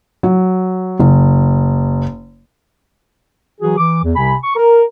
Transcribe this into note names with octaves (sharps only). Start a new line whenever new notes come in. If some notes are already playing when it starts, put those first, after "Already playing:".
F#3
F#1
E3 F#3 F#4 G#4
E3 D6
E2
C2 C3 G#5 B5
C#6
A#4